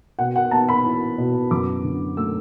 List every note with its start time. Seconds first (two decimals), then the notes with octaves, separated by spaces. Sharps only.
0.19 B2 F#5
0.36 F#5
0.51 B3 A5
0.69 B5
0.84 E4
1.18 B2
1.51 F#2 D6
1.84 D3
2.17 A3 E6